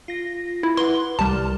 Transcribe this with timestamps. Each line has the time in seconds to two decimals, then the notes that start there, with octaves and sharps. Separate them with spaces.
0.08 F4 A#6
0.63 E4
0.77 B4 F#5 C6
1.19 C2 G3 A5 F6